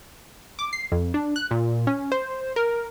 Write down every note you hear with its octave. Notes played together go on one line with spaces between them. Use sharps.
D6
C7
F2
D4
F#6
A#2
C#4
C5
A#4